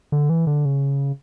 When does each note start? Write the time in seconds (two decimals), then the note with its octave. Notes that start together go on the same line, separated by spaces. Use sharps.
0.12 D3
0.30 E3
0.47 D3
0.65 C#3